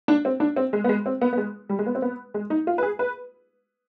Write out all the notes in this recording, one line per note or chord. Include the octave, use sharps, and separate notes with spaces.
D4
C4
D4
C4
G#3
B3
G#3
C4
B3
B3
G#3
G3
G#3
B3
C4
B3
G#3
D#4
F4
B4
G#4
B4